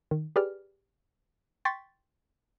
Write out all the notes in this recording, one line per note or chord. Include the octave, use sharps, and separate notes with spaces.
D#3
G4 G#4 B4 D5 F6
G5 C6 C#6 A6 B6